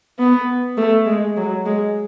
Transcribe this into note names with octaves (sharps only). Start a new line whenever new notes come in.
B3
A3
G#3
F#3
G#3